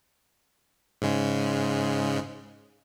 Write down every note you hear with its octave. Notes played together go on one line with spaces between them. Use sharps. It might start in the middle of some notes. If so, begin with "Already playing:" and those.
G#2 C#3 G#3